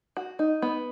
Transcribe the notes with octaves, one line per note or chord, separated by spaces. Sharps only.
F#4
D#4
B3